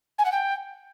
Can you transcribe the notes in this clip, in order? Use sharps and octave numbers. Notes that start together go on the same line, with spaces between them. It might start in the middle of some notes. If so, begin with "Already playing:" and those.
G#5
F#5
G5